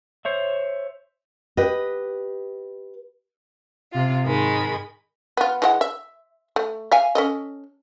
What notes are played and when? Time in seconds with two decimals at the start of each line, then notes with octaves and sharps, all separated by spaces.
0.25 C5 C#5 E5
1.57 G4 B4 D#5
3.92 C3 F4
4.24 G#2 D#3 G#3 B5
5.37 B3 F4
5.62 E3 G#3 F#5
5.81 E5
6.56 A3
6.92 E5 F5 G#5
7.15 C#4 A4 D#5